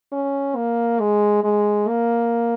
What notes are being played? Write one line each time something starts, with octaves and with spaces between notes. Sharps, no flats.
C#4
A#3
G#3
G#3
A#3